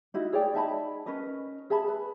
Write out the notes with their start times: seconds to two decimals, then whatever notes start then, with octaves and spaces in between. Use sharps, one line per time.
0.14 D#4 E4 F#4
0.33 G#4 C#5 D5 G5
0.54 D#4 E5 A5 B5
1.06 C#4 A#4 B4 D#5
1.70 G#4 E5 A5 B5
1.88 B4